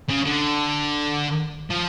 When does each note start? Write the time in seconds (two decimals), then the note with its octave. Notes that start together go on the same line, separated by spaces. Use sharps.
0.09 C#3
0.26 D3
1.70 F3